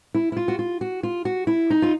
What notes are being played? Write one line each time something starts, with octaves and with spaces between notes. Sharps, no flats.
E4
E4
F4
F#4
F4
F#4
F4
F#4
E4
D#4
F4